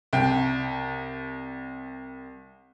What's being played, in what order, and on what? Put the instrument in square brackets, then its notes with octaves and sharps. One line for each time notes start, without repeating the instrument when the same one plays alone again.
[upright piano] C2 G5